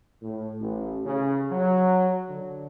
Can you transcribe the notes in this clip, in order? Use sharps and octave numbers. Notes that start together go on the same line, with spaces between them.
A2
A1
C#3
F#3
D3